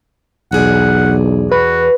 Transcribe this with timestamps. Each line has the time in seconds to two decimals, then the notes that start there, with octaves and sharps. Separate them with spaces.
0.52 B1 E2 G#4 D5 F#5
1.51 F#4 B4